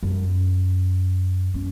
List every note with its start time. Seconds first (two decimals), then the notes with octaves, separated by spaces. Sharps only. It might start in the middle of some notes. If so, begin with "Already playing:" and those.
0.03 F#2
1.54 C#4